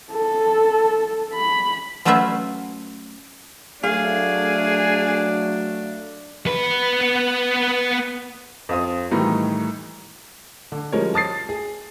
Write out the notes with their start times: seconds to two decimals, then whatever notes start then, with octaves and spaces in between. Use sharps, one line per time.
0.12 A4
1.34 B5
2.05 F#3 A3 C#4 F4 B4 E5
3.83 F#3 A3 D4 G#4 F5
6.47 B3 B4
8.69 F2 F4 D#6
9.11 A2 D#3 E3 G3 D#4
10.72 D3
10.92 F3 G3 G#3 C#4 A#4 C#5
11.14 A5 D#6 A6 C7
11.49 G#4